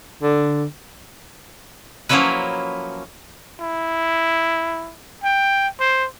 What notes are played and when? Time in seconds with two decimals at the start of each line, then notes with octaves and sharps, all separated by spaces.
0.22 D3
2.09 F3 F#3 A#3 C#4 E4 B4
3.60 E4
5.24 G5
5.80 C5